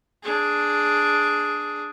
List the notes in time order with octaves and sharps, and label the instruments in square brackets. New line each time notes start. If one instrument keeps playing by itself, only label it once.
[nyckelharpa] D4 G#4